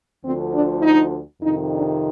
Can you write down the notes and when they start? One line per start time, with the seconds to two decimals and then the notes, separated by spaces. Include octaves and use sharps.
0.22 D2 D3 F3 C4
0.53 D4
0.82 D#4
1.42 F2 C3 D#3 D#4
1.72 D4